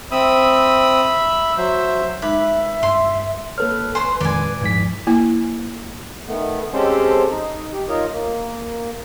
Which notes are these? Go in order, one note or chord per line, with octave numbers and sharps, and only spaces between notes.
C4 E5 B5 D#6 E6
F#3 C5 E5
G#3 D#4 B4 E5 D6
G2 C6
A#3 A4 B4 C#5 F6
C5 G#5 C6 C#6
F2 A#2 D#3 G#3 D5 G#5
E2 G#2 F3 G#3 B6
A#3 E4 G#5
D#3 A3 B3
G#3 C4 C#4 G4 A4 C5
D#4
G4
D#4 F4 A#4 C#5 D#5
A#3